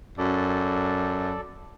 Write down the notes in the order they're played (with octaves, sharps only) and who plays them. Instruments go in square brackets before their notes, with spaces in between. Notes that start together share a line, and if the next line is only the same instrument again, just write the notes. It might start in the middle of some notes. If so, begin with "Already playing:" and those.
[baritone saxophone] F#2 [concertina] A4 D5